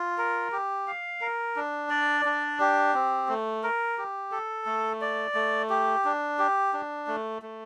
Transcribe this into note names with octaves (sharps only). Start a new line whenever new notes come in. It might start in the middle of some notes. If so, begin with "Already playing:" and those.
Already playing: F4
A#4
G4
F5
A#4
D4
D5
D4
G4
C4
A3
A#4
G4
A4
A3
D5
A3
G4
D4
G4
D4
A3
A3